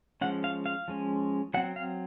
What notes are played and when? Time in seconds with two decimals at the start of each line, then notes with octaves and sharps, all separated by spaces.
0.21 F3 G#3 C#4 F#5
0.44 F5
0.66 F5
0.88 F3 G#3 C#4
1.54 F#3 F#5
1.57 C4
1.76 F5